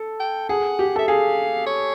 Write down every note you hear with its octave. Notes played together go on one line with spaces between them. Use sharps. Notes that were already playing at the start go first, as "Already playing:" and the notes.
Already playing: A4
G5
G#4 F#5
G4
A4 E5
G#4 F5
C#5